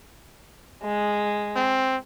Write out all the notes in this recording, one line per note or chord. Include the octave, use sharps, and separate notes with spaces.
G#3
C4